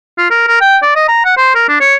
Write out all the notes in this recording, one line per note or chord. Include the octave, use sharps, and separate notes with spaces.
F4
A#4
A#4
G5
D5
D#5
A#5
F#5
C5
A#4
D4
C#5